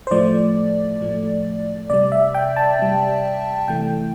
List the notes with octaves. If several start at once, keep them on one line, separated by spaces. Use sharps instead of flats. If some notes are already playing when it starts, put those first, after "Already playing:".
C5
A2 F3 A3 D5
A2 F3 A3
C3 G3 D5
E5
G5
A5
C3 G3
C3 E3 A3 G5